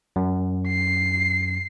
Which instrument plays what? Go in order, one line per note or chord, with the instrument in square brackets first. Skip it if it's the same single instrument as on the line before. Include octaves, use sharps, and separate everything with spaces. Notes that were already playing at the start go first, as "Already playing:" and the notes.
[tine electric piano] F#2
[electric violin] C7